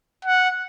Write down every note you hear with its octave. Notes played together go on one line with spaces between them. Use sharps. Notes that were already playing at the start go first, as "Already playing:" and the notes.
F#5